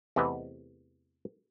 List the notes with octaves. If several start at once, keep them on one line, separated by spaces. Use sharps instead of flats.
E2 C3 E3 A3 B4 D#5